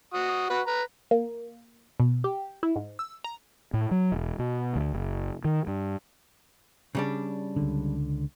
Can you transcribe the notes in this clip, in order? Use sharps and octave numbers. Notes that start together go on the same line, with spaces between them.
F#4 D#6
F#4 B4
B4 A#5
A#3
B2
G4
E4
G#2
E6
A#5
A2
F#3
E1
B2
D2
F#1
D#3
G2
C#3 G3 D4
C#2 D3